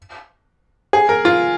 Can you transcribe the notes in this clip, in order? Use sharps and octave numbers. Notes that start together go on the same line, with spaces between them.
G#4
A#4
F4